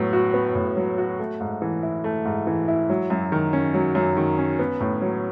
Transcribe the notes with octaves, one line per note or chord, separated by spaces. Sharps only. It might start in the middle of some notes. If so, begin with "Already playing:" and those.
Already playing: A2 F#3 B3
F#4
B3
A2
F#3
F#4
A3
G#2
E3
E4
A3
G#2
E3
E4
F#3
F#2
D#3
C#4
F#3
F#2
D#3
C#4
B3
A2
F#3